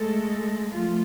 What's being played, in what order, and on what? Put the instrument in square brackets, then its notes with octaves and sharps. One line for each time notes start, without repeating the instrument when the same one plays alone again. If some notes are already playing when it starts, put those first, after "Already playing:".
Already playing: [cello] G#3 [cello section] A3 A4
[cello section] F3 F4 [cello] A3